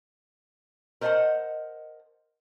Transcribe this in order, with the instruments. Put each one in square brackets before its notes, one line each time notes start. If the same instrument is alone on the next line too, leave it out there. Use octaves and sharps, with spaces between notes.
[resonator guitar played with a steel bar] A#4 C5 D#5 E5 F#5 A5